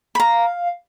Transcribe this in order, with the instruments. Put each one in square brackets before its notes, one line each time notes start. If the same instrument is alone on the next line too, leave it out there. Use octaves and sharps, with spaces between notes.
[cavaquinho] B5
[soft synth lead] F5 [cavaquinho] A#5